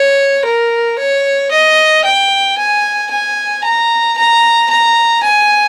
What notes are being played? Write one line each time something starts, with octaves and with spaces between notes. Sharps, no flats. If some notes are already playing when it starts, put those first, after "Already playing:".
Already playing: C#5
A#4
C#5
D#5
G5
G#5
G#5
A#5
A#5
A#5
G#5